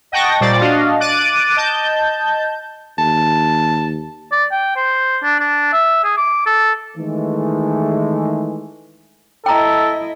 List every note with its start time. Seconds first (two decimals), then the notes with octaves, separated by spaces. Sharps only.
0.12 D#5 F#5 G5 A5 C#6 A#6
0.40 A#2 G3 C5 D5 A6
0.61 D4 F#4 D#5 F5
1.00 D6 F#6 A6 D7 D#7
1.57 D#5 A5 G6
2.98 D#2 A5
4.32 D5
4.51 G5
4.76 C5
5.23 D4
5.39 D4
5.73 E5
6.04 G#4
6.18 D6
6.46 A4
6.97 D#3 E3 G#3 A3
9.46 E4 A4 D#5 G5 A#5